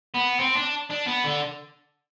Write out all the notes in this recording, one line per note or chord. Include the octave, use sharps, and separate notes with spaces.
B3
C4
D4
D4
B3
D3